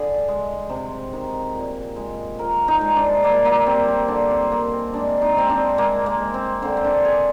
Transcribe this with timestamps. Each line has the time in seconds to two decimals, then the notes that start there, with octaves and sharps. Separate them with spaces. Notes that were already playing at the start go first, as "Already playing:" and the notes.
Already playing: D3 G#4
0.28 G#3
0.70 C3
1.13 D#3
1.54 A#2
1.96 G#3
2.39 F3 A#4
2.68 D#4
2.81 G#3
2.96 D4
3.24 G3 A#3
3.45 A#3
3.66 G3 C4
3.88 C4
4.08 D3 D4
4.31 C4
4.52 G#3 A#3
4.72 C4
4.93 G#3 D4
5.22 D#4
5.36 G#3 C4
5.50 D4
5.78 G#3 A#3
6.06 A#3
6.20 G#3
6.34 C4
6.62 D3 C4
6.77 C4
6.85 D4
7.05 D3 G#4